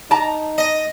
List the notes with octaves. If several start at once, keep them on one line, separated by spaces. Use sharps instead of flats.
D#4 A5 A#5
D#5